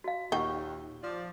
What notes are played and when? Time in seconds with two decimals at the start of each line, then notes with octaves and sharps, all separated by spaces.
0.04 F#4 F5
0.32 D#2 A#2 D#4 F#5 G5 C#6
1.03 F3 D5